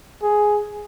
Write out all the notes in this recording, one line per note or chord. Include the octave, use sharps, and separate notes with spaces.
G#4